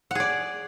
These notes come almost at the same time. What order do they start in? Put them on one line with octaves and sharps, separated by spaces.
F#5 G#4 D5